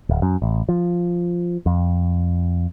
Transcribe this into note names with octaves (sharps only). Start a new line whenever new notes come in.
D1
F#2
A1
F3
F2